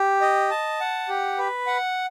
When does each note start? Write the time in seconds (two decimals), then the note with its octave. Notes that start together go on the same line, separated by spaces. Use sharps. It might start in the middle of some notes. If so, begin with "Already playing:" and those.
Already playing: G4
0.21 D#5
0.51 A5
0.80 F#5
1.09 G4
1.38 B4
1.67 F#5